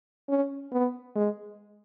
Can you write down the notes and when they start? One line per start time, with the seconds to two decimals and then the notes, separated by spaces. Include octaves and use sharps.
0.29 C#4
0.72 B3
1.16 G#3